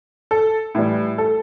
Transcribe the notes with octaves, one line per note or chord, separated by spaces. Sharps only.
A4
A2 E3 G3
A4